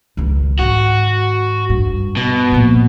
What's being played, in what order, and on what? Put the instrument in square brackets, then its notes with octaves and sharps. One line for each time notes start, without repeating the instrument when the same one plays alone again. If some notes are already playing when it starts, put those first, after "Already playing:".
[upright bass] C#2 D#3
[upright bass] G#2 D#3 [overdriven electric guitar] F#4
[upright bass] G2
[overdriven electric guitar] B2
[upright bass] A#2 F3